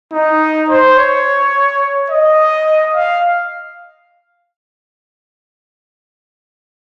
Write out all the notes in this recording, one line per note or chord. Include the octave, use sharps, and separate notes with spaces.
D#4
C5
C#5
D#5
F5